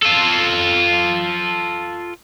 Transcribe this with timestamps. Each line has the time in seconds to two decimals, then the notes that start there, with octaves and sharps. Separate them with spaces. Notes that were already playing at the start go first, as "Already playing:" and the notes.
0.03 F4 A4